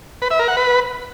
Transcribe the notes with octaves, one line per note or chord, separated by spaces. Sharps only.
B4
E5
A#4
F#5
B4